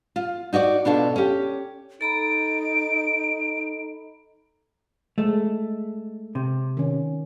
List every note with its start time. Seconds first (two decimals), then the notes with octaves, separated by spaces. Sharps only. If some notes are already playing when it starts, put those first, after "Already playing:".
0.16 F4
0.53 D#4 F#4 C#5 D5
0.85 B2 D4 F4 A4
1.16 C#4 G4
2.01 D#4 A4 A#5 B5 D7
5.18 G#3 A3
6.35 C3
6.77 D#3 C#4